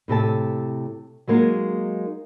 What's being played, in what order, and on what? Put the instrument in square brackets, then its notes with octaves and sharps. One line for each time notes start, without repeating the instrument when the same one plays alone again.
[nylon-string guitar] A2 C3 A4 A5
F#3 G#3 A#3 D#4